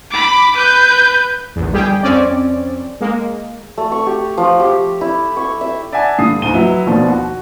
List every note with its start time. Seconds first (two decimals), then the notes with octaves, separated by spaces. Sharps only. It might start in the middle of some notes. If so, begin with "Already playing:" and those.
0.11 B5 D6
0.55 B4 G6
1.56 A#1 E2
1.72 G1 G3 G4 G#4 G5
2.03 F2 C4 C#4 D5
3.01 G#3 A#3
3.77 A3
3.92 C#6
4.06 G4
4.38 F3
4.60 G4
5.01 E4
5.37 C#6
5.61 E5
5.92 D5 E5 F#5 G#5 A5
6.18 G2 D3 D#6 C7
6.42 C#2 G#2 D#7 G7
6.54 F#3 E4 B4
6.87 D#2 B2 F3 D4
7.08 F#4